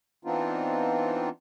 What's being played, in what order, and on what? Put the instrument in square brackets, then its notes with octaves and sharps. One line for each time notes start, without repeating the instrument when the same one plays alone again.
[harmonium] E3 B3 C4 D4 D#4 F4